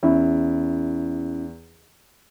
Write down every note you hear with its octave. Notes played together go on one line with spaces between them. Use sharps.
E2 C#4 E4